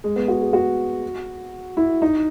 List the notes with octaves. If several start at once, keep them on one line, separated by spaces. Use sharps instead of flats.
G#3
B3
F#4
G#4
F#4
E4
D#4